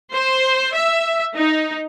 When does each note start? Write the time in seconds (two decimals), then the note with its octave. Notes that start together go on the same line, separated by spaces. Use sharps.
0.13 C5
0.73 E5
1.35 D#4